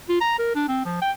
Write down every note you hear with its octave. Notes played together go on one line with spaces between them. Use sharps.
F4
A#5
A#4
D4
C4
F3
G5